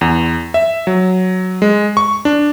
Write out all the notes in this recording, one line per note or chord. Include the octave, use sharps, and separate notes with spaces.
E2
E5
F#3
G#3
C#6
D4